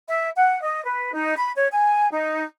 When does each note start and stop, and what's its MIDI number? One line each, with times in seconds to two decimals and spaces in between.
0.08 0.29 76
0.36 0.63 78
0.63 0.83 75
0.85 1.12 71
1.13 1.33 63
1.37 1.51 83
1.56 1.67 73
1.72 2.08 80
2.11 2.43 63